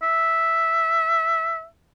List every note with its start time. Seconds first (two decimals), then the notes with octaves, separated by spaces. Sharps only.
0.03 E5